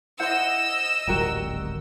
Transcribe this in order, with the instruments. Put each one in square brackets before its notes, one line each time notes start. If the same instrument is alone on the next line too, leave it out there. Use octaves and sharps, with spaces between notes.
[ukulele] E4 C5 F#5 [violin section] D#5 E6
[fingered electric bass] D1 G#1 G3 [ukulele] F#4 A#4 G5